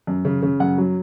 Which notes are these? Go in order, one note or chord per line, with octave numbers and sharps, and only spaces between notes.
F#2
C#3
C#3
F#2 F#5
F#3